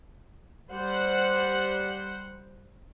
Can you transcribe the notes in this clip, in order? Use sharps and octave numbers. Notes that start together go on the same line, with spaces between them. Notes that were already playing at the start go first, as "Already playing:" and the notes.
G3 C5 F#5